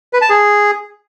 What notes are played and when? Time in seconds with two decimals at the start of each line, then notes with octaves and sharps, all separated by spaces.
0.13 B4
0.21 A5
0.30 G#4